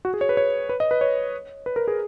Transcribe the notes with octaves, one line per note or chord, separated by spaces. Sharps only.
F#4
G#4
C#5
B4
C#5
B4
D#5
B4
C#5
B4
A#4
G#4